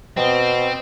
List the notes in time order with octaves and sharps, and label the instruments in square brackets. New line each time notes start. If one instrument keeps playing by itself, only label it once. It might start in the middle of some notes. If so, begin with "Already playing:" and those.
[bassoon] B2 [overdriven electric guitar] C4